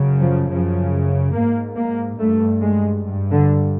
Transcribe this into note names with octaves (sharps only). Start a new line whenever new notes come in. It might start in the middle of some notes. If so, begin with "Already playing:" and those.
Already playing: F#2 C#3
F3
F#2 C#3 F3
G#2 A#3
A#3
G2 A3
G#3
G2
D3